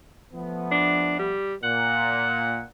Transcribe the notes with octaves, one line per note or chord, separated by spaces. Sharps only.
F3 A3 B3
D4
G3
A#2 F#5